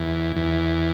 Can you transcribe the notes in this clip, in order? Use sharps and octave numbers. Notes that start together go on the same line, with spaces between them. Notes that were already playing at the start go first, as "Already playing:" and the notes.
Already playing: E2
E2